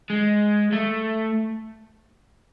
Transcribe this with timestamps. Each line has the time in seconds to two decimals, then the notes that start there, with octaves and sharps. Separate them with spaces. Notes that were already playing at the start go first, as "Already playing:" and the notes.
0.10 G#3
0.73 A3